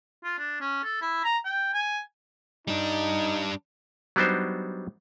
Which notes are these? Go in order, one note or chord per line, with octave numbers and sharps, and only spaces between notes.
F4
D4
C#4
A4
E4
A#5
G5
G#5
G3 D4 D#4
F#3 G3 B3 D4 D#4 C5